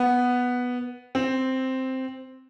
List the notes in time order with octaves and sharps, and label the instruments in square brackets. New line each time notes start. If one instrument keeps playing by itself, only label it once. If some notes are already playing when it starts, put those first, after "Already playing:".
Already playing: [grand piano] B3
C4